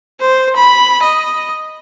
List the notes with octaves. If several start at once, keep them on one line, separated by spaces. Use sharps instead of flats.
C5
B5
D#5